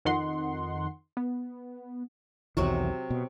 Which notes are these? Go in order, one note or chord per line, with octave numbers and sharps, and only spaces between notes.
F2 D#3 D#4 F#5 C6
B3
B1 E2 C3 D#3 F#3 F#4
B2